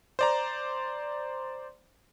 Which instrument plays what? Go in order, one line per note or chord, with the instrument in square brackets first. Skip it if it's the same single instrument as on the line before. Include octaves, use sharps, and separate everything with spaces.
[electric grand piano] C5 D5 A#5